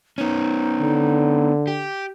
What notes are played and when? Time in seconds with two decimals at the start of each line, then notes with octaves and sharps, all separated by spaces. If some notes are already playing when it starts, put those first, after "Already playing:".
0.18 B3 C#4 D#4
0.80 D3
1.67 G4